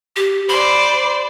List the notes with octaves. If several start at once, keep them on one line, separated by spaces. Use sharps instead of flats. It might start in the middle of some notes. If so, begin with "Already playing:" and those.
G4
C5 D5 B5